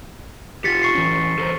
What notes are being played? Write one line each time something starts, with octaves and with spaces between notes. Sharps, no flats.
F4 G4 A6 B6 C#7
C#6 C7
E3 C#4
A4 A#4 C5